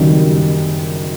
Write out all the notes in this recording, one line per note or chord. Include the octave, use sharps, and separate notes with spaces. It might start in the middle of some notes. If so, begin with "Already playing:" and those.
Already playing: F#1 F#2 D#3 G3